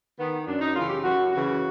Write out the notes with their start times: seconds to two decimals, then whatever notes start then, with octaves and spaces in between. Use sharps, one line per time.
0.19 D#3 B3
0.47 F#2 D4
0.61 D#4
0.75 C#3 E3 F4
0.89 G4
1.03 F#2 F#4
1.31 C#3 E3 F#4